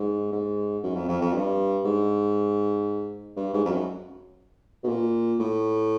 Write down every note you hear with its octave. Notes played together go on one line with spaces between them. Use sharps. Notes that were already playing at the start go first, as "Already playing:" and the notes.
Already playing: G#2
G#2
F#2
F2
F2
F2
G2
G#2
G2
G#2
F2
F#2
B2
A#2
A2